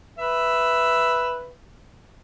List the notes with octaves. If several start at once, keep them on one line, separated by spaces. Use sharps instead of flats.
B4 E5